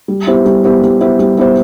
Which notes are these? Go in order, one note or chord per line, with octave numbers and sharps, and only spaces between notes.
G3
B3 E4 G4 C5
G3
B3 E4 G4 C5
G3
B3 E4 G4 C5
G3
B3 E4 G4 C5